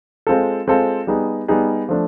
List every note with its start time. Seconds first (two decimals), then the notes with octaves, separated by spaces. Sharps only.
0.27 G#3 C4 F4 A4
0.67 G#3 C4 F4 A4
1.07 G3 B3 D#4 G#4
1.48 G3 B3 D#4 G#4
1.89 F3 A3 D4